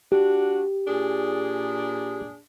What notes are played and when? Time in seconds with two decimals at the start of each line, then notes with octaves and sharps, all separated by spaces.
0.12 D4 F#4 G4
0.88 A#2 D4 G#4